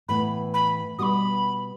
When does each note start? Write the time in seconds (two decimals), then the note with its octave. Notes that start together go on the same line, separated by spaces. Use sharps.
0.08 A2 E3 B3 B5
0.53 B5
0.98 B2 G3 B3 F#4 B5 D#6